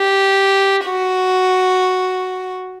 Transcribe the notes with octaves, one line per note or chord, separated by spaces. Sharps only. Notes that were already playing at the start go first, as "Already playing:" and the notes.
Already playing: G4
F#4